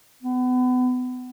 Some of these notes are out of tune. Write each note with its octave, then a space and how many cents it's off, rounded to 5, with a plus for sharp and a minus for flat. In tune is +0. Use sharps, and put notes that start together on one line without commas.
B3 +30